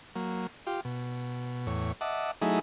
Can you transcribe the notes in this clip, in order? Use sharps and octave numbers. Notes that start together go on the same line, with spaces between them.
F#3 A#3
F4 G4
B2
E2 A2 C#5
D#5 E5 F#5 A5 D6
F#3 A3 D#4 E4 G#4